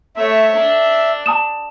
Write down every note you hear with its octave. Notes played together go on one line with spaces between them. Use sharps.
A3 C#5 E5
D4
A5 D#6 E7